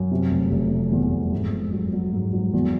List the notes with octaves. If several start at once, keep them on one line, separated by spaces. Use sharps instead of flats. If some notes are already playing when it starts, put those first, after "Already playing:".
Already playing: F#2
C3
F1
F1
C3
E2
F1
G#2
G#2
F#3
F#3
G#2
F#3
E2